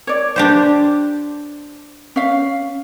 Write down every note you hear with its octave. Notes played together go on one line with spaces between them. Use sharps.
C#5 D5
D4 G4 C5
C#4 F5